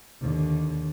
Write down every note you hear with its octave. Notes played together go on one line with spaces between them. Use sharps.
D#2 D3